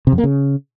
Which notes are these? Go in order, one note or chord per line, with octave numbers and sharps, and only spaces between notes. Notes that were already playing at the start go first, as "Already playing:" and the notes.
C3
F2
A#3
C#3